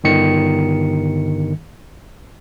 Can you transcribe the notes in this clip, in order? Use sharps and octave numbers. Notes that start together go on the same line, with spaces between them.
G1 D#3 C#7